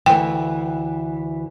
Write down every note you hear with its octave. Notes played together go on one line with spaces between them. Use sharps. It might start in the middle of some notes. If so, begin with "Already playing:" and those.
D2 E3 G5